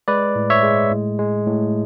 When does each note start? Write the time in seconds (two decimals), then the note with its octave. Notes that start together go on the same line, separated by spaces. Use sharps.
0.08 G#3 B4 D5
0.36 A2
0.50 C#5 E5
0.63 G#3
0.91 A2
1.19 G#3
1.47 A2